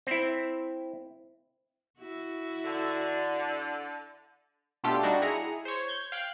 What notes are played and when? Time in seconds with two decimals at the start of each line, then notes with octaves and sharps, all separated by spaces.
0.07 C4 E4
1.99 E4 F#4
2.64 D3
4.84 B2 A3 D4 F4 G4 A4
5.03 G3 D4 D#4 F#4
5.22 E4 G#4 A#5 C#7
5.65 C5 C#5
5.88 G6 G#6
6.12 F5 G5 F#6